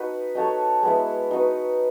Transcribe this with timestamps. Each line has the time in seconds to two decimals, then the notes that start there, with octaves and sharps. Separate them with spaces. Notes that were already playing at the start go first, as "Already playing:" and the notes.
Already playing: B3 D#4 F#4 B4
0.35 D#4 F#4 A4 C#5
0.83 G#3 B3 E4
1.31 D#4 F#4 B4